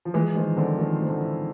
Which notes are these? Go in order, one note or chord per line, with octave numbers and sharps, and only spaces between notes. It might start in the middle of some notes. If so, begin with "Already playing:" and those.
F3
E3 G#3
D#3 F3
D3 C4
D#3 F3
F3
D3
E4